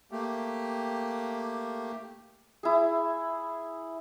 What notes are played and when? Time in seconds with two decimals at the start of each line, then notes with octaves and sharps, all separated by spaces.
0.12 A3 A#3 G4
2.63 E4 G#4